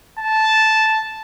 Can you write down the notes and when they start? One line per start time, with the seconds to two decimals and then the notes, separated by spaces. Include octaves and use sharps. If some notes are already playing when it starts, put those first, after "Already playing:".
0.19 A5